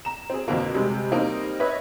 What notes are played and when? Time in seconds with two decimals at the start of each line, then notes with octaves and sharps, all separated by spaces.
0.05 A#5 E7
0.30 C4 G#4
0.48 F2 B2 D3 A#3
0.74 C3 G3 G#3
1.12 G3 A#3 C4 D#4
1.60 B4 C#5 D#5 E5